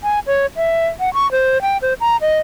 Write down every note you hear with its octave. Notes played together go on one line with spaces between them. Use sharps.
G#5
C#5
E5
F#5
C#6
C5
G5
C5
A#5
D#5